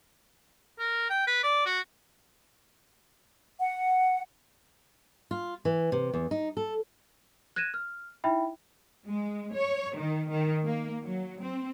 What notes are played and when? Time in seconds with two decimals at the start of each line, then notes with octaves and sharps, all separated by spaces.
0.79 A#4
1.10 G5
1.27 B4
1.43 D5
1.66 F#4
3.59 F#5
5.31 F4
5.65 E3
5.92 C3
6.14 E2
6.31 D#4
6.57 A4
7.56 F#6 G#6 A#6 D#7 E7
7.74 F6
8.24 D#4 E4 E5 G5 B5
9.05 G#3
9.54 C#5
9.95 D#3
10.30 D#3
10.63 A#3
11.01 F#3
11.41 C4